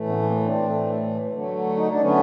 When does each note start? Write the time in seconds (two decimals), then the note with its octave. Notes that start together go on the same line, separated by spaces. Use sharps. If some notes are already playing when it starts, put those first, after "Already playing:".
Already playing: A2 E3 A3
0.09 B3 C#4
0.23 B3
0.27 A#3 C4
0.44 C4 D4
0.62 A2 E3 A3
1.32 D3 F#3 A3
1.77 D#4
1.89 D4
2.01 D3 F#3 A3 B3 C#4